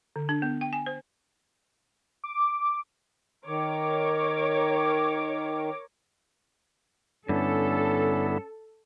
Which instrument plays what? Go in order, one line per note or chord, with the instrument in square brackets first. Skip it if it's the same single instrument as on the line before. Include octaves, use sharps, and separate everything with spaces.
[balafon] D3
D4
B3
G5
G#5
C5
[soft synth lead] D6
[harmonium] D#3 [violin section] A#4 C#5 D6
[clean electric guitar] G2 [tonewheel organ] D3 B3 E4 [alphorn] C#4 [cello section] A4